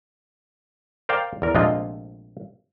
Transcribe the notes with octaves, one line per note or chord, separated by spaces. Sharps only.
A#4 C5 D5 F5 G5
E2 A#4
A#1 C3 G#3 A3 F4 D#5